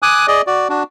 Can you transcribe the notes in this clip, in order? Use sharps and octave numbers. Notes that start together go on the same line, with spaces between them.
G#5 D6 D#6 F#6
G#4 D5 D#5
F#4 D5
D4 F#4